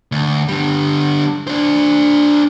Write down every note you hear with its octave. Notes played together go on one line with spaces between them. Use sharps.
D2
D3 G3
D4 C5